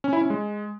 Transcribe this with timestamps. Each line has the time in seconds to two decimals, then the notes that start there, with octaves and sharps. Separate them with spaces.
0.04 C#4
0.13 E4
0.21 C#4
0.30 G#3